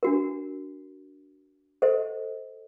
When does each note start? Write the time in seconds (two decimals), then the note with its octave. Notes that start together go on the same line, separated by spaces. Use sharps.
0.03 D4 F#4 A#4
1.82 A4 C5 D#5